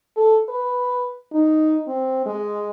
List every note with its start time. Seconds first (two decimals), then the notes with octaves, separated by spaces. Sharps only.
0.17 A4
0.49 B4
1.33 D#4
1.88 C4
2.26 G#3